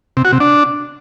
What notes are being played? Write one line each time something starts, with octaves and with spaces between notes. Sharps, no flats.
C3
F#4
C3
D4